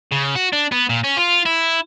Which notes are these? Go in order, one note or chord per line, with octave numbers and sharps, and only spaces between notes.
C#3
F#4
D4
B3
A#2
C#4
F4
E4